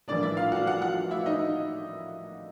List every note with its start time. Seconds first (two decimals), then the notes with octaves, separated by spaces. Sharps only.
0.08 A#1 A2 E3 G3 A#3 D4 D5
0.23 E4 E5
0.37 F4 F5
0.52 F#4 F#5
0.67 F#4 F#5
0.82 F#4 F#5
1.11 E4 E5
1.26 D#4 D#5